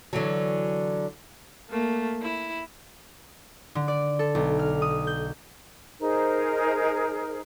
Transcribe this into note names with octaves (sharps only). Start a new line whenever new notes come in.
D3 E3 F#3
A3 A#3
E4
D3
D5
A4
B1
F6
D#6
G6
D#4 G#4 A#4 C5